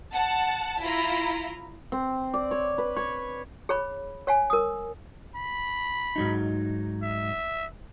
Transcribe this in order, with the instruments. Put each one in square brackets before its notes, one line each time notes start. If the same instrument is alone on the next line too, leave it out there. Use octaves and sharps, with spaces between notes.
[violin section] F#5 A5
E4 F4 A#5
[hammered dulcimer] C4
D5
C#5
B4
C#5
[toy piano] G#4 C#5 B5
C#5 F5 G#5
A#4 D#6
[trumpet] B5
[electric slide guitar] G#2 F#3 D#4
[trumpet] E5